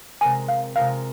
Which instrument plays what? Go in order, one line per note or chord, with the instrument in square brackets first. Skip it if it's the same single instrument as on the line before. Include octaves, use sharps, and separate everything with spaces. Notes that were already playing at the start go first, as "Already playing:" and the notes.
[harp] C3 G#3 F4 A#4 [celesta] G#5
[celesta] F5
[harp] C3 G#3 F4 A#4 [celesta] F5